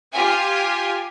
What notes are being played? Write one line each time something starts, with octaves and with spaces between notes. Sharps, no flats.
F4 G4 G#5